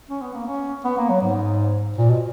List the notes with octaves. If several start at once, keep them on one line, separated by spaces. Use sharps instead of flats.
C#4
B3
A#3
C#4
B3
A#3
F#3
G#2
A#2
B2